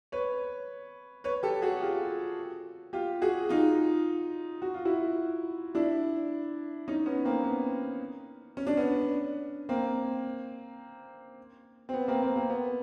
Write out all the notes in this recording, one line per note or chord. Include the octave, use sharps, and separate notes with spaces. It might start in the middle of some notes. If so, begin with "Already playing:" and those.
B4 C#5
B4 C#5
G4 A4
F#4 G#4
F4 G4
F4 G4
F#4 G#4
D#4 F4
F#4
F4
E4 F#4
D4 E4
C#4 D#4
B3 C#4
A#3 C4
B3
C#4
D4
B3 C#4
A#3 C4
C4
B3
A#3 C4
A#3 C4
A#3 C4
B3